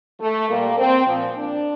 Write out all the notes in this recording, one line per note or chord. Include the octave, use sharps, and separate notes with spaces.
A3
A#2 G3 A#3
C4
A#2 F3
D4